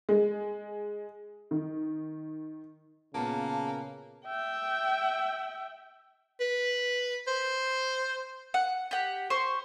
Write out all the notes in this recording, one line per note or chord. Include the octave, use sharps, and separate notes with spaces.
G#3
D#3
A#2 C#3 A#3 B3 A5
E5 G5
B4
C5
F#5
G4 F#5
C5 C6 C#6